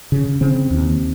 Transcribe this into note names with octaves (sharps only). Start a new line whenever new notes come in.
C#3
C#3 C4
D#2